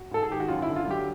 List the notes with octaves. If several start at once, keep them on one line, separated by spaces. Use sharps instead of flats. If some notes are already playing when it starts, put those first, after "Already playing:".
Already playing: F#4
G#2 A4
G#4
D#3 G4
F#4
F#2 F4
E4
D3
F4
F#3 G4